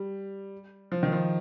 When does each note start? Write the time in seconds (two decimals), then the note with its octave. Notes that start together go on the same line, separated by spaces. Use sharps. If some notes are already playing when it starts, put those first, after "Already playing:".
Already playing: G3
0.92 F3
1.03 D#3
1.12 F3